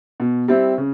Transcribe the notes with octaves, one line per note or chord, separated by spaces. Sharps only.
B2
G3 C4 E4
C#3